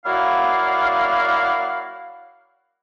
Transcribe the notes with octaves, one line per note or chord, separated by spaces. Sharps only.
F#3 A#3 E4 F#4 D5 F5